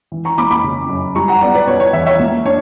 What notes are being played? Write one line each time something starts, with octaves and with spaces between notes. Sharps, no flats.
E3
A#5 C#6
A#3 B5 D6
B5 D6
C#3
F#2
G3 A#5 C#6
F#5 A#5
B3 D5 F#5
B4 D5
B2 C#5
C#5
E2 C#5 E5
C#5 E5
A#3
D4 C#5